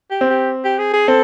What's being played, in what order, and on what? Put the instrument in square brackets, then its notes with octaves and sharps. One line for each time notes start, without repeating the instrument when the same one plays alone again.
[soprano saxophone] G4
[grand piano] C4
[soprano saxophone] G4
G4
G#4
G#4
[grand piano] C4 [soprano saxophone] A4